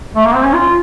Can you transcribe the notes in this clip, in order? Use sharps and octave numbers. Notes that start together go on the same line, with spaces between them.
A3
A#3
C4
C#4
F4